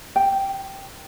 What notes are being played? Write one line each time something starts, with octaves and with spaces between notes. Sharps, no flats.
G5